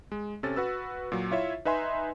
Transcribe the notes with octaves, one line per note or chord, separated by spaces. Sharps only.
G#3
C3 C#4 A4 A6
F#4 B4 E6
A#2 F#3
E4 F4 C#5 E5
D#4 B4 E5 G#5 C6